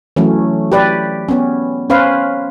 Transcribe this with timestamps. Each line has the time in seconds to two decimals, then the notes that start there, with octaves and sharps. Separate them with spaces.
0.16 E3 F#3 A3 C#4
0.72 G4 B4 D5
1.29 B3 C#4
1.90 C#4 B4 C5 F5